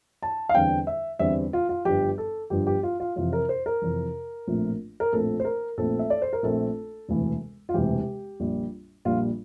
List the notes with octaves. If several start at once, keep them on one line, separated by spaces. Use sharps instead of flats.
A5
F5
E2 D3 G3 C4 G5
E5
E2 D3 G3 C4 E5
F4
F4
G1 G2 F3 G4
A4
G1 G2 F3 G4
G4
F4
F4
F2 C3 E3 F4
A#4
C5
A#4
F2 C3 E3
A#1 A2 F3 A3 C4
A#4
A#1 A2 F3 A3 C4 A4
C5
A#4
A#1 A#2 A3 C4 A4
E5
D5
C5
A#4
A#1 A#2 A3 C4 A4
E1 D2 C3 E3
F4
E1 D2 C3 E3 G4
A#1 A#2 G3
A#1 A#2 G3 F4